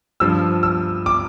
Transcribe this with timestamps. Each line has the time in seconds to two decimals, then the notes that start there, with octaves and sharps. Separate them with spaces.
0.20 G2 F3 E6
0.63 E6
1.06 D6